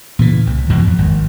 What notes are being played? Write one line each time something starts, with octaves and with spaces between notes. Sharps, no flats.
A#2 C#3 E3
C2
E2 G#2 B2 G#3
F2
G#1